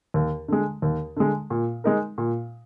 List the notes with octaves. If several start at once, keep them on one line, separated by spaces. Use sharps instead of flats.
D#2
D3 G#3
D#2
D3 G#3
A#2
G#3 D#4 A#4
A#2